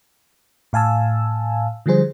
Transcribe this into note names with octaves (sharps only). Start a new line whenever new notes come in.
A2 F5 G#5 A5 E6
D3 F3 G3 G#4 C5